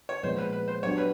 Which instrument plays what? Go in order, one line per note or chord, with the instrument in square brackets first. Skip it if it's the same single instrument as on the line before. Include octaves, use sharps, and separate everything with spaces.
[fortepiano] C#5
[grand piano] A#2 F3 G#3 B3 [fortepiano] C5
[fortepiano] B4
B4
C5
[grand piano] F#3 B3 D4 G4 [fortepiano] C#5
[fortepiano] B4